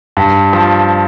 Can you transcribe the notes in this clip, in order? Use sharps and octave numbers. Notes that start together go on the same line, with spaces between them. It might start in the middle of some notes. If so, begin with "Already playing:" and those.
G2
F3